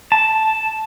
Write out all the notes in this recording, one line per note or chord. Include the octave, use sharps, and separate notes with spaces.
A5